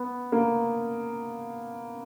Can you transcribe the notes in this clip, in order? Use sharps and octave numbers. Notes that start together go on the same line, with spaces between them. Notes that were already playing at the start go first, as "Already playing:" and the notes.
Already playing: B3
A#3